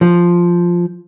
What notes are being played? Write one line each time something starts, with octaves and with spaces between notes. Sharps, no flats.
F3